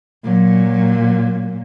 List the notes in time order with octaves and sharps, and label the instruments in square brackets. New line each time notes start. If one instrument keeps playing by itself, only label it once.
[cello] A#2 F#3